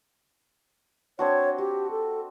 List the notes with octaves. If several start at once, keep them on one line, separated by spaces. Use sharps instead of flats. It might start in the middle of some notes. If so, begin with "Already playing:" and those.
C4 D4 F#4 C#5
F#4 G4
A4